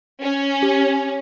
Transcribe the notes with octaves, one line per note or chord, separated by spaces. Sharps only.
C#4
G4